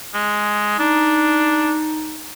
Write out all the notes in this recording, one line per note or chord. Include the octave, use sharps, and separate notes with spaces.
G#3
D4 D#4